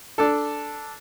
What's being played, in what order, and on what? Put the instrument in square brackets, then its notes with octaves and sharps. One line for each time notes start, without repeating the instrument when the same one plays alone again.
[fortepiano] D4 A4